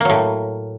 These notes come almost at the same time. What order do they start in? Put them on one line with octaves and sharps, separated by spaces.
A#3 F#3 A2